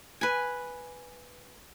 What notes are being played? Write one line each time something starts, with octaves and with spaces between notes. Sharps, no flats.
B4 G#5